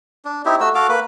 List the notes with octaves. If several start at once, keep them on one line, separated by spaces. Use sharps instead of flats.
D4
C4 D#4 E4 G4
A3 F#4 E6
F#4 A4 F5 D6
A#3 B4